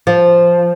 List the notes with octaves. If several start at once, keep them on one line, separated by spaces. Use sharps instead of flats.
F3